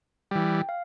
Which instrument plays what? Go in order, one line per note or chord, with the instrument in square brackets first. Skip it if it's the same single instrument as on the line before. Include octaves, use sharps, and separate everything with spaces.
[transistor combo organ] E3 G3 [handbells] G5
[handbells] F5